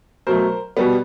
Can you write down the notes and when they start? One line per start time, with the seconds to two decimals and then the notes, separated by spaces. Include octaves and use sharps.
0.27 B2 F#3 A3 A#4 C5
0.77 B2 G3 B3